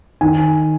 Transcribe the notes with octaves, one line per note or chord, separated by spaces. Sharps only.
D#3 G#5